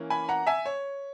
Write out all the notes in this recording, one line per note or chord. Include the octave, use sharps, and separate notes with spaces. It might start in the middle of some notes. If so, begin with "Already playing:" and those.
Already playing: E3 A#3 C#4
G#5 B5
F#5 A#5
E5 G#5
C#5